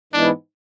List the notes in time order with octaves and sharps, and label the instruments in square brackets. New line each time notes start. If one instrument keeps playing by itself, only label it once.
[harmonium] G#2 E3 G#3 B3 E4 [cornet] D4